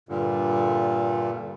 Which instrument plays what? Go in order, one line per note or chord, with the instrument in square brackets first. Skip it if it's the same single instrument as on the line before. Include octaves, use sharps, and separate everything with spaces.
[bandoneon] G2 A#2 D3